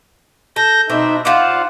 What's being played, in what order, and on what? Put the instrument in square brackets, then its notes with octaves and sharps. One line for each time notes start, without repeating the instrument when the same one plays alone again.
[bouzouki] A4 [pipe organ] G6 A#6
[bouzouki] B2 C4 D4 [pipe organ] D#4 E5
[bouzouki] F4 C5 D5 [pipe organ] F5 F#5